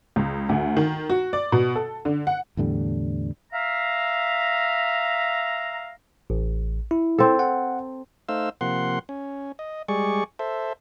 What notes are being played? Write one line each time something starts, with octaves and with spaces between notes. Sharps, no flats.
C#2
D2
D#3
F#4
D5
B2
A4
D3
F#5
E2 A2 D3 G3
E5 F5 A#5
A1
E4
C4 A4
F#5
A3 D#4 C5 F5 E6
C3 F3 A#3 F#5 C6
C#4
D#5
G3 G#3 G#4 D5 C#6
A4 C5 E5